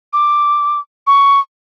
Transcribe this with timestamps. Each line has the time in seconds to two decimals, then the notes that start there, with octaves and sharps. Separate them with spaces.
0.13 D6
1.07 C#6